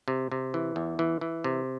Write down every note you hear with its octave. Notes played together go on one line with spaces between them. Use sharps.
C3
C3
E3
E2
E3
E3
C3